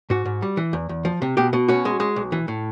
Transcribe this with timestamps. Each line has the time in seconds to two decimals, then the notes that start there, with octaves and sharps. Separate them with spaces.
0.10 G#2 F#4
0.25 G#2
0.42 G3
0.57 E3
0.73 E2
0.89 E2
1.05 F3
1.22 C3
1.37 B2 G4
1.53 B2
1.68 C#4 F#4
1.85 G#3
2.00 G#3
2.16 B1
2.32 E3
2.48 A2